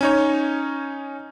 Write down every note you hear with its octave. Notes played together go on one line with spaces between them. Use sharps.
C#4 D#4 C#5